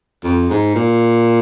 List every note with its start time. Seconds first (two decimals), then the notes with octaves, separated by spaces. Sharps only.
0.24 F2
0.49 G#2
0.75 A#2